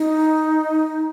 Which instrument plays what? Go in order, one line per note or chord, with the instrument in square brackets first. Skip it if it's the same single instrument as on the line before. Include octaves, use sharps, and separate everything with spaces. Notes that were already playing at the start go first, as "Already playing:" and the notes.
Already playing: [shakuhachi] D#4